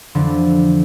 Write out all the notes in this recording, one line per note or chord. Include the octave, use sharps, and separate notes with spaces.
F2 D3 E3 F3 D4